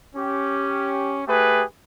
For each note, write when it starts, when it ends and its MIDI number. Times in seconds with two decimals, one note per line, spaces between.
0.16 1.22 61
0.16 1.22 67
1.27 1.63 57
1.27 1.63 67
1.27 1.63 68
1.27 1.63 71